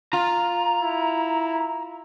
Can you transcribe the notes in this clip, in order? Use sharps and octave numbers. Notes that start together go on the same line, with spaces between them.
F4 A#5
E4